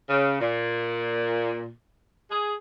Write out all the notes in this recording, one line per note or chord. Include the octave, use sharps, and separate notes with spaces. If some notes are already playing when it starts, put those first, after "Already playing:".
C#3
A#2
G#4